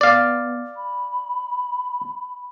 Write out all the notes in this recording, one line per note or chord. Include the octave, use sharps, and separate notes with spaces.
B3 D5 F5
B5